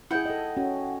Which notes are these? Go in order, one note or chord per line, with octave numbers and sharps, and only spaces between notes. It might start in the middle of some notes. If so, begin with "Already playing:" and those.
E4 G#4 F#5 G5
A4 D#5
C#4 F#4